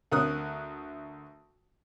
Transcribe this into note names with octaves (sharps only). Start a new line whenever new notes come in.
D2 A#4 D#6 F#6